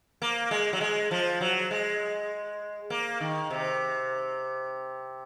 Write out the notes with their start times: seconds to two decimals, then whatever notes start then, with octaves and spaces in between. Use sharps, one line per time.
0.22 A#3
0.51 G#3
0.73 F#3
0.81 G#3
1.11 F3
1.41 F#3
1.71 G#3
2.90 A#3
3.20 D#3
3.50 C3